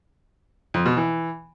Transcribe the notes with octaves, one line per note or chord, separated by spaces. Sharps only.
F2
B2
E3